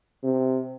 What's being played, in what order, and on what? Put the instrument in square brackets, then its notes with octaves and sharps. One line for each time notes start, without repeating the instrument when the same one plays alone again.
[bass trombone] C3